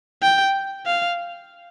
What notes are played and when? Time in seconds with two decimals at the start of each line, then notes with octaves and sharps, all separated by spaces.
0.22 G5
0.86 F5